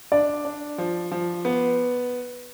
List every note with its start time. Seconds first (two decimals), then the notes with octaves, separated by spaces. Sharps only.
0.12 D4 D5
0.45 D4
0.78 F3
1.11 F3
1.45 B3